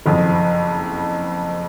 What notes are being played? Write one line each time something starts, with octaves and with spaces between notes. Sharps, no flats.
F#1 F2 F3